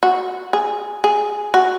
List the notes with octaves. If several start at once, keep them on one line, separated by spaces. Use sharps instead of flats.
F#4
G#4
G#4
F#4